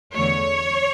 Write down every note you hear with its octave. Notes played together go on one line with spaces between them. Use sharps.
E2 D3 A3 C#5